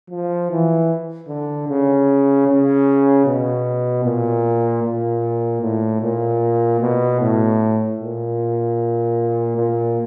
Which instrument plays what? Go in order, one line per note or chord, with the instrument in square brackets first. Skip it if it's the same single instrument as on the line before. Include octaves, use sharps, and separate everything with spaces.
[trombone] F3
E3
D3
C#3
C#3
B2
A#2
A#2
A2
A#2
B2
A2
A#2
A#2